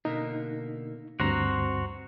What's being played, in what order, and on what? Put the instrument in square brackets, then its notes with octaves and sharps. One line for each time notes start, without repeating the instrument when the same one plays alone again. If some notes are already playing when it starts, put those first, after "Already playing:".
[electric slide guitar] B2 D3 A#3 [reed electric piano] D#4
[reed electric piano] D2 G2 [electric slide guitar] C4 [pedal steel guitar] F#4 C5 A#5